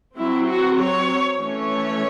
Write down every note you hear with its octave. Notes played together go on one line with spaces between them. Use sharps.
F#3 C4 E4
F#4
C#5
E3 A3 C#4 C#5